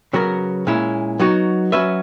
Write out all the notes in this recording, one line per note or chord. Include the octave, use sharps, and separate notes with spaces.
C#3 F#3 B3 F#4 A#4
A#2 G#3 C#4 E4
F#3 B3 D#4 F#4
F#3 C#4 F#4 B4 E5